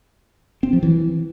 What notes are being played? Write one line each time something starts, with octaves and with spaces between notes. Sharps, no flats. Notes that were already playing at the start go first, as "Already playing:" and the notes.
C4
F3
E3